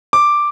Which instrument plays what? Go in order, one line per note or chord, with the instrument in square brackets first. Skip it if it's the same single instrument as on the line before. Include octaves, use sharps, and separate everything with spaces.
[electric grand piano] D6